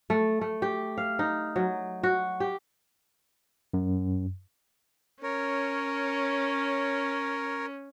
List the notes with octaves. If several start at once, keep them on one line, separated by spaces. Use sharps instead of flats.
A3
A3
G4
F5
D#4
F#3
F#4
G4
F#2
C#4 A#4 C#5